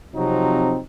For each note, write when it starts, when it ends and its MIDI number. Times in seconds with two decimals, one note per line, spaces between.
0.15 0.79 48
0.15 0.79 53
0.15 0.79 54
0.15 0.79 60
0.15 0.79 63